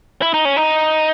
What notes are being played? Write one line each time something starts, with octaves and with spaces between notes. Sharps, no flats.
E4
D#4
C#4
D#4